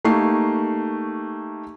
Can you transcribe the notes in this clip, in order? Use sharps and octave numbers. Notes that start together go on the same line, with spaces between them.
A3 A#3 D#4 G4 C#6 C7